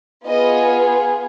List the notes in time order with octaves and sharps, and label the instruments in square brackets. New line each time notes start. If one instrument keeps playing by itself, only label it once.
[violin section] B3 F4 G#4 D#5